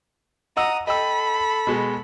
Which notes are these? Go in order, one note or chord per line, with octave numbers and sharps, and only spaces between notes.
D#5 F#5 A#5 D#6 E6
A4 D#5 G5 B5 E6
B2 G#3